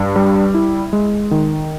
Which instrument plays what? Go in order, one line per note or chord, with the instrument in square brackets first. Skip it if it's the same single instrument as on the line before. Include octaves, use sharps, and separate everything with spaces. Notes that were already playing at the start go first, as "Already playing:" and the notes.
Already playing: [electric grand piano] G2
G3
E4
G#3
D#3